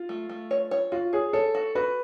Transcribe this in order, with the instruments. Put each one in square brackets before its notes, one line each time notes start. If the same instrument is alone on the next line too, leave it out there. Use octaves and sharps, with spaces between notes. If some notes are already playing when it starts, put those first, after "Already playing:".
Already playing: [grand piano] F4
[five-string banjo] A3
A3
C#5
C#5
[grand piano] F4 [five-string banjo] F#4
[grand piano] G#4 [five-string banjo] C#5
[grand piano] A4 [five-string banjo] C#5
[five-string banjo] F#4
[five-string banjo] F#4 [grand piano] B4